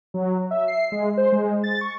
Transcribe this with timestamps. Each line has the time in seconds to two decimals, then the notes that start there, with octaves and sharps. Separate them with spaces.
0.14 F#3
0.51 E5
0.68 C7
0.92 G#3
1.17 C5
1.32 G#3
1.64 A6
1.81 C#6